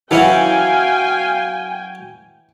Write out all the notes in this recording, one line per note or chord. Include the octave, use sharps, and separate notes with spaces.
E3 F#3 C#4 F5 G5 G#5